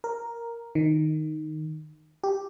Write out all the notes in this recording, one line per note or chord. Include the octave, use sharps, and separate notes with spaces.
A#4
D#3
G4